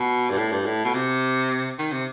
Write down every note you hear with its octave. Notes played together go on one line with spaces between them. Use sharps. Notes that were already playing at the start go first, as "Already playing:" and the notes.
Already playing: B2
G2
A2
G2
A2
B2
C3
D#3
C3